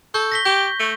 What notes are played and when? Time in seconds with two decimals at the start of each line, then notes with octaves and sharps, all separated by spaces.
0.14 A4 C#6 G6
0.32 A#6 B6 G7
0.45 G4 G6 G7
0.79 A3